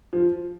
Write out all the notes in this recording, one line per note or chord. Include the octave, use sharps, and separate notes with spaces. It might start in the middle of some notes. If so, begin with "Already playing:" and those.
F3